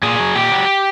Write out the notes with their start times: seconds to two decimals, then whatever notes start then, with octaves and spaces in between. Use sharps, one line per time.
0.03 A#2 G#4
0.19 F#3
0.35 A#2 G4
0.52 F#3